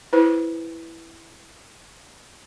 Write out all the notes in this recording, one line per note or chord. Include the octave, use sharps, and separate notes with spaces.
E4 B4 C5